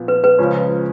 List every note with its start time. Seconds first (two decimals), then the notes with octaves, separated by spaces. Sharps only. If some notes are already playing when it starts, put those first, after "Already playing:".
Already playing: A#2 F3 B3
0.08 B4
0.24 B4
0.38 C#2 C#3 F3 G#3 C#4